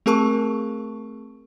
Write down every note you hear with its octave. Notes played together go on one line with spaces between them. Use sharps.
A3 C4 G#4 A#4 A5 C#6